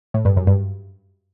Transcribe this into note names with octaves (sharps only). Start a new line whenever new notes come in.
A2
G2
F#2
G2